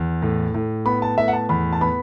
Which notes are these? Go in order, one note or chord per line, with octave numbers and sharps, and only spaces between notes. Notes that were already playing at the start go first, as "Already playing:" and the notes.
Already playing: E2
A2
A2
B3 B5
A5
A2 E5
F#5
A5
E2 B5
A5
B3 B5